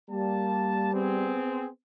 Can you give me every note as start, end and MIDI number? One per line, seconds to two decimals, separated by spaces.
0.11 1.36 55
0.11 0.94 58
0.11 0.94 81
0.94 1.68 59
0.94 1.68 60
0.94 1.68 68